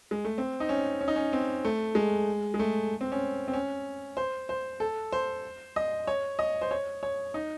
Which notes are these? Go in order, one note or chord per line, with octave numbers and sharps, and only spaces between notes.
G#3
A3
C4
D#4
C#4
C#4
D#4
C#4
C4
A3
G#3
G#3
A3
C4
C#4
C4
C#4
C5
C5
A4
C5
D#5
C#5
D#5
C5
C#5
C#5
D#4